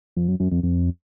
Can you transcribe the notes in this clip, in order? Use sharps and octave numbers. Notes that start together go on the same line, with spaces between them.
F2
F#2
F#2
F2
F2